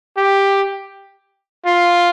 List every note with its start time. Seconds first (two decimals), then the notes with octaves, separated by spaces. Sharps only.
0.17 G4
1.66 F4